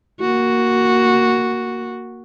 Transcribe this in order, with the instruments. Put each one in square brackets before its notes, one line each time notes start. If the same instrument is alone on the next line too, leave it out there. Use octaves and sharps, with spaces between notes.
[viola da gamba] A#3 F#4